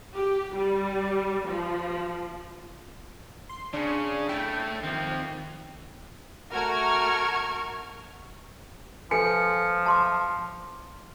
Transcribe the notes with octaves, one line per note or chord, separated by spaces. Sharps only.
G4
G3
F3
C6
C#3 C#4 D4
A3 E4 G5
D#3 F3 C4
A3 F#4 A#4 C#6 F6 G#6
F3 A4 B4 G#5 C#7
A5 C6 D6